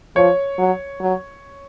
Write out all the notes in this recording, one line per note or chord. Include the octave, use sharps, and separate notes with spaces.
F3 C#5
F#3
F#3